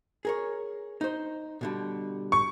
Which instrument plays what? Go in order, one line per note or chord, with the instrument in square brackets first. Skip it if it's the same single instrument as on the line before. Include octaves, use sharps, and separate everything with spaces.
[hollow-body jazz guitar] G#4 A#4 C#5
D#4 C5
B2 D3 G3
[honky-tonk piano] C#6